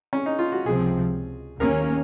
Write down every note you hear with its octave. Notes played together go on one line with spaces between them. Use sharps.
C#4
D#4
F4
F#4
C#2 C3 F3 C4 G#4
D#2 D#3 A#3 C#4 A#4